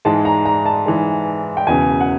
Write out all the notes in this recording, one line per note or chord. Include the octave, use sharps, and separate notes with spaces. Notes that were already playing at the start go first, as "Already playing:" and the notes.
G#2 E3 G#3 A5
A#5
A#5
A5
G#2 E3 G#3
G5
E1 E2 C#3 G#5
F#5